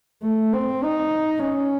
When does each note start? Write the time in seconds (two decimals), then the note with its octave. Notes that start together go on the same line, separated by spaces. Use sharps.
0.23 A3
0.53 C4
0.83 D#4
1.43 C#4